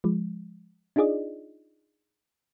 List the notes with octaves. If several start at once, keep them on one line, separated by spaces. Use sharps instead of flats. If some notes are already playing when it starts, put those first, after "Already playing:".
F3 G#3
D4 D#4 F4 G#4 D5 D#5